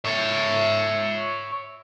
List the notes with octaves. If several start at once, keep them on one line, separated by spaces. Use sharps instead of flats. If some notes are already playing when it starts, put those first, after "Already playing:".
C#5 E5